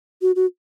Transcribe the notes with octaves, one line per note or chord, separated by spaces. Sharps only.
F#4
F#4